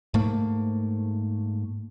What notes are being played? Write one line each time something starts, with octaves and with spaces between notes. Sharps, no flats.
G#2 A3 A#3